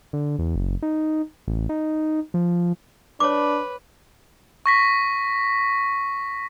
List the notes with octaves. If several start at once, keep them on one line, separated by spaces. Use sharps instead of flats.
D3
E2
F#1
D#4
A1
D#4
F3
D4 B4 C#5 D6
C#6 A#6 B6